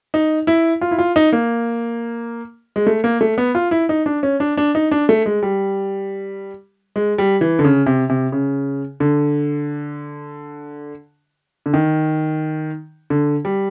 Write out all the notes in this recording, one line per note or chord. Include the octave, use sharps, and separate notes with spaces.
D#4
E4
F4
E4
F4
D#4
A#3
G#3
A3
A#3
A3
B3
F4
E4
D#4
D4
C#4
D4
D4
D#4
D4
A3
G#3
G3
G#3
G3
E3
D3
C#3
C3
C3
C#3
D3
D3
D#3
D3
G3